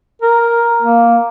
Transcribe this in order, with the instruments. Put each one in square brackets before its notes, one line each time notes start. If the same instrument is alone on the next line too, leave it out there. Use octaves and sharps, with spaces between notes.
[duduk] A#4
A#3